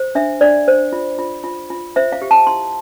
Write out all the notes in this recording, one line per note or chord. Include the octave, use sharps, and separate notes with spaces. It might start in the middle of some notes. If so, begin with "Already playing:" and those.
Already playing: C5
D4 E5
D4 D5
C5
F4
F4
F4
F4
C5 E5
F5
G4
A5
E4 C6